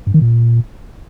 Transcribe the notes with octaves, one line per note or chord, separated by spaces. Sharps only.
G2
D#3
A#2